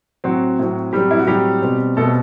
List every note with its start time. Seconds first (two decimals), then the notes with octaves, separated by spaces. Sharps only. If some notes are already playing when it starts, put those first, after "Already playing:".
0.24 A2 F#3 C4 F#4
0.59 A2 F#3 C4
0.93 A2 F#3 G3 C4 G4
1.11 E4
1.20 F#4
1.27 A2 F#3 G3 C4 G4
1.62 B2 G3 C4
1.97 B2 G3 A3 C4 A4